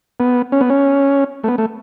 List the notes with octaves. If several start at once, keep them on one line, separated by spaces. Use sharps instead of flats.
B3
C#4
B3
C#4
A3
B3
A3